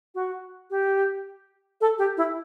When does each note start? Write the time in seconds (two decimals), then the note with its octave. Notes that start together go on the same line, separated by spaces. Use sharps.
0.15 F#4
0.70 G4
1.81 A4
1.98 G4
2.17 E4